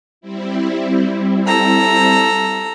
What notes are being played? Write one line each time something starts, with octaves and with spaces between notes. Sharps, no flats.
G3 C4 E4
A4 A#5